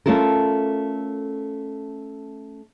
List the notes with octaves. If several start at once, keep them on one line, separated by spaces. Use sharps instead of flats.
A3 C#4 F4 A4 A#4